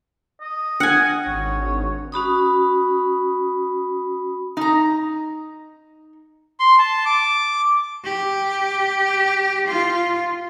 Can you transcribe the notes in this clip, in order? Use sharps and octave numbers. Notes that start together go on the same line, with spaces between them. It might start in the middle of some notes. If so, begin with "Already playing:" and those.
D#5
D4 F#5 G#5
G#1 C#5
C#4 F#4 B5 D#6
D#4 A#5
C6
A5
D6
G4
F4